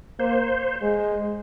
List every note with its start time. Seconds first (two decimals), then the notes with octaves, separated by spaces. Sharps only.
0.19 A#3 C5
0.82 G#3